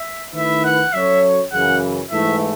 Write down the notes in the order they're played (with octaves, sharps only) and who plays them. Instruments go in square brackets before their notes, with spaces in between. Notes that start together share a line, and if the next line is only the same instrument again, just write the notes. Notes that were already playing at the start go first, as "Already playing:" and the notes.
Already playing: [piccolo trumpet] E5
[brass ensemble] D#3 A3 E4 B4 [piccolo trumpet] E5
[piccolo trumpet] F#5
[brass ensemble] F#3 C#4 F#4 A4 C#5 [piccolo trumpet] E5
[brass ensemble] F#2 C#3 E3 [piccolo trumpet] F#5
[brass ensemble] G#2 E3 A3 [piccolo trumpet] E5